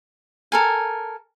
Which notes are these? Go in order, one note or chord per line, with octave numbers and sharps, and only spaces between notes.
A4 A#4 G#5